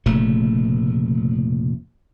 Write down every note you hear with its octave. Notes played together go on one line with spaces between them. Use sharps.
F1 A#2 C#3 A3